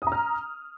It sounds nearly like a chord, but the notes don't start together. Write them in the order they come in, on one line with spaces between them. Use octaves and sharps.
D#6 A#5 F6